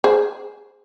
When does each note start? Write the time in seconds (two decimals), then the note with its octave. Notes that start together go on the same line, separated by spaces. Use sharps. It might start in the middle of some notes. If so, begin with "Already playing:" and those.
0.04 G#4 C5